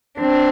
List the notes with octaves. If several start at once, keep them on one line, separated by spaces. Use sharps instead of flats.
C4 D4